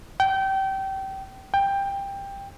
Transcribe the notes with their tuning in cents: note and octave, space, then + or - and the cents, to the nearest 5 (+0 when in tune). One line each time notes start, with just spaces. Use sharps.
G5 -25
G5 +15